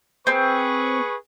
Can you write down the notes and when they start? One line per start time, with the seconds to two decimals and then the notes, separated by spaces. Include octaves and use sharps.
0.27 C4 G#4 B4 C#6